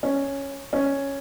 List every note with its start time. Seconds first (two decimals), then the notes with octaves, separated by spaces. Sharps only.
0.03 C#4
0.73 C#4